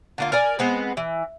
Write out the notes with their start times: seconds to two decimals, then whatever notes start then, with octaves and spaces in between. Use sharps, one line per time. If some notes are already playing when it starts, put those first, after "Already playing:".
0.18 D3 A#3 F4
0.32 A#4 D5 G#5
0.59 G#3 B3 C4
0.97 E3